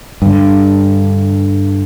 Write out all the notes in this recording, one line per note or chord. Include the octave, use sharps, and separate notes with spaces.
G2 D3